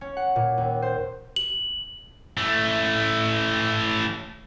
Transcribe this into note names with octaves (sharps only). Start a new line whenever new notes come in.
C#4
F#5
A#2
D#2
C5
F#7
E3 A3